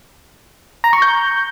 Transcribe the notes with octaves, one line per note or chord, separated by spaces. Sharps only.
A#5
C#6
G6